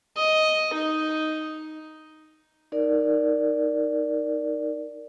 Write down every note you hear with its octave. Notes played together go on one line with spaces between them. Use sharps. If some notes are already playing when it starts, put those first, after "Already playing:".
D#5
D#4
D#4 A#4 D5